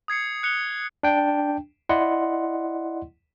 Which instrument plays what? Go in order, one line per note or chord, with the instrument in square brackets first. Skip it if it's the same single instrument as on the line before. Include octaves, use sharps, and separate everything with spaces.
[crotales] D#6 G#6 C7 C#7
F#6 C#7 F7 G7
[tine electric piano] D4 G5
E4 D5 D#5 F#5 C6